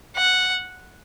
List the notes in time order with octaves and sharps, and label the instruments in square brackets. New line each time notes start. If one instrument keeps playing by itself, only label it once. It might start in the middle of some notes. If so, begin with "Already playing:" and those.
[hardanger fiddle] F#5